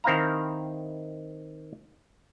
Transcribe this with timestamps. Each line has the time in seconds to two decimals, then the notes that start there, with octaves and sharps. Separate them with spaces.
0.04 D#3 C4 E4 F5 A#5